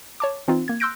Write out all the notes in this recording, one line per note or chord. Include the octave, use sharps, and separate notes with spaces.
C#5 A5 D6
E3 C4 D#4 F4
A#3 G#6
C6 E6 F#6 G6 A#6 D7